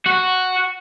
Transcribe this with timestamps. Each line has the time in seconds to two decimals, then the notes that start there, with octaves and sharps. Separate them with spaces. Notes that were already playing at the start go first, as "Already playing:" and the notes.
0.06 F#4